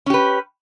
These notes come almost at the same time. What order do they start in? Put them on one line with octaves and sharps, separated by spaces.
C#4 G4 B4